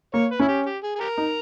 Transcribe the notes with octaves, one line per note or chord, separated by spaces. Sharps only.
A#3 C#5
B4
C#4 E4
G4
G4
G#4
G#4
G4 A#4
D#4